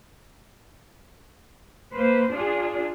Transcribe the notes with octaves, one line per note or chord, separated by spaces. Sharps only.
A#3 B4 C5
D4 F4 G#4